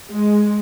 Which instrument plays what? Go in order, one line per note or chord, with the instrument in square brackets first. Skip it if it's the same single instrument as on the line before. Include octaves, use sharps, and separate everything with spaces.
[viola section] G#3